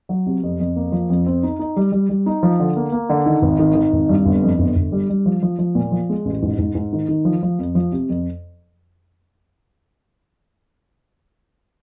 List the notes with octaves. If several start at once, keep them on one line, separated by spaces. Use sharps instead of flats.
F#3
C3
F2
F2
A#3
F3
F2
C4
D#4
D#4
G3
G3
G3
D#4
F3
D3
A#3
A#3
D3
D#3
G#1
D#3
D#3
G#1
G2
G1
F2
G1
G1
G3
G3
F3
F3
F3
A#2
F3
G#3
A1
G#2
G#2
G#2
D#3
D#3
F3
F3
F2
F3
C3
F2